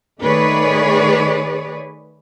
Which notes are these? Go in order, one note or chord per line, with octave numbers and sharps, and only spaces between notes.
D#3 A3 G#4 B4 C#5 D5